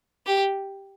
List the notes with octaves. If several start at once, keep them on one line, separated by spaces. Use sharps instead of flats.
G4